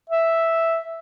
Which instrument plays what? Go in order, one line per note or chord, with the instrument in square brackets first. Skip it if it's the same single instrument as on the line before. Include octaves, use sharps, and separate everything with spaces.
[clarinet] E5